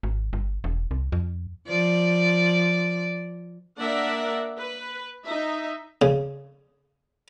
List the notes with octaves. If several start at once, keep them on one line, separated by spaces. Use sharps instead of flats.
G#1
G1
E1
C2
F2
F3 D5
A#3 D4 A#4 D5 E5 F#5
B4
D#4 E5
C#3